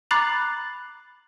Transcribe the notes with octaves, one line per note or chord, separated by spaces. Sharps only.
A#5 B5 D6 F#6 A6 C7